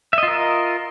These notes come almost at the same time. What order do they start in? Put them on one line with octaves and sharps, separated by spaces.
E5 D#5 F4 A#4